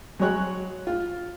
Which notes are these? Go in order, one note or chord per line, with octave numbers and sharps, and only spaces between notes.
F#3 G#3 C#5 F#6
F4